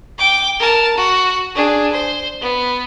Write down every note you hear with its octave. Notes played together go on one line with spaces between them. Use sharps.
G5 D6
A#4 A5
F#4
D4 G#4
C5
B3